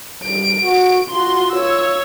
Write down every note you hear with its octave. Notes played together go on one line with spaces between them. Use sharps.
G3 D7
F#4
F4 F#4 C6
C#5 E6